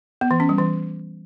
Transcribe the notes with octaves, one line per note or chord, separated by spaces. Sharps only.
B3
E3
C#4
G3
E3